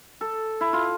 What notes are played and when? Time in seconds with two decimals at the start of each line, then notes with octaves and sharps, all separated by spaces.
0.21 A4
0.61 E4
0.73 F4